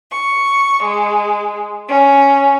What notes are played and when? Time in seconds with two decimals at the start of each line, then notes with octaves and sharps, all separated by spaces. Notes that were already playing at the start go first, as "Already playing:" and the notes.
0.13 C#6
0.83 G#3
1.89 C#4